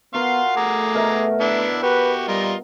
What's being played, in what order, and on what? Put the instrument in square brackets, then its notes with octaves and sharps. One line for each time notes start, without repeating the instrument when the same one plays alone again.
[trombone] B3 [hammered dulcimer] F#4 A#4 [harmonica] F5 C6
[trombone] A3 [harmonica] G#4 A#5 D6
[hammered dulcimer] B2 A#4 E5
[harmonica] B3 D4 E4
[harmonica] F#4 G4 [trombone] B4
[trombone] G3 [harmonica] F4 A#4 D#5